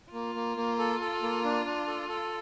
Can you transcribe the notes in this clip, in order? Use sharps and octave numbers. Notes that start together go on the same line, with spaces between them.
A#3 F4
A#3
A#3
A4
A4
A#3
D4
D4
A4
A4